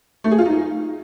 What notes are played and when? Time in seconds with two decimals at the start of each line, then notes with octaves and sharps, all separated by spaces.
0.24 A3
0.31 G#4
0.38 F4
0.46 D#4